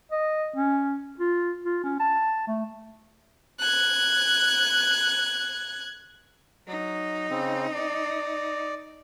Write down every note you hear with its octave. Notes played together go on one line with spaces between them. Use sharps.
D#5
C#4
F4
F4
C#4
A5
A3
F#6 G#6
F#3 D#4
C#3 C4
D5